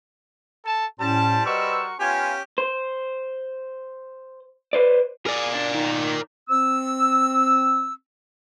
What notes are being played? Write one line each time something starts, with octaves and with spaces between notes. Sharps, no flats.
A4 A5
A2 G3 C#4 C5 A5
F#4 A#4 B4 D#5 C#6 E6
B3 C#4 F4 G4 G#5
C5
B4 C5 D5
G#4 A#4 D5
D4
D#3
C4 E6